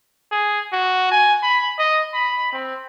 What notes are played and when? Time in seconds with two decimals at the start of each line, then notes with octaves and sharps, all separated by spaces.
0.32 G#4
0.73 F#4
1.11 G#5
1.43 B5
1.79 D#5
2.14 B5
2.53 C4